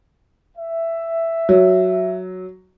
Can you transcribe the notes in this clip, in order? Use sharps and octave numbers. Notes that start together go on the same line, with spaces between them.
E5
F#3